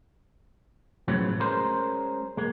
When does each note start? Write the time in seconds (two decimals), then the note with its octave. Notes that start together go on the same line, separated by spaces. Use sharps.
1.08 A2 C#3 F3 F#3 B3
1.40 G#3 C#4 A#4 C5
2.37 G#3 A#3